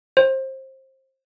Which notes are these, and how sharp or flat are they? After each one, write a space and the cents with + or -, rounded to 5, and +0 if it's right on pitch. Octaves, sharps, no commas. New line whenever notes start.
C5 +25